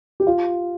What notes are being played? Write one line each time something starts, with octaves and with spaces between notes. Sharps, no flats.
G4
F4